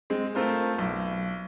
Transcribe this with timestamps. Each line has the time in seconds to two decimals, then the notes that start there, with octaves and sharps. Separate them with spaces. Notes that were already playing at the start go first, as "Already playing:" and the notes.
0.10 G#3 C4
0.35 A3 C4 F4 A#4 C5
0.78 B1